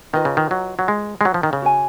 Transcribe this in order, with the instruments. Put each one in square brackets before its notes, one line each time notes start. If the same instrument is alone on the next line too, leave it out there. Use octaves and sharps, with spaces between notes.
[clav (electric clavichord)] D#3 [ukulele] F4 B4 D#5 A#5
[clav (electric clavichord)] C#3
D#3
F#3
F#3
G#3
G#3
F#3
F3
D#3
C#3
[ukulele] F#4 C#5 G#5